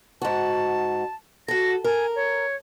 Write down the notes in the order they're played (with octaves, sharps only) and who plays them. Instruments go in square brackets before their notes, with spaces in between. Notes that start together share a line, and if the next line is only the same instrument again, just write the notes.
[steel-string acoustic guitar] G#2 F#4 [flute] A5
[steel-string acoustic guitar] F#4 A4 [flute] A#6
[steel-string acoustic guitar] A#4 [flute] G#5
[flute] C#5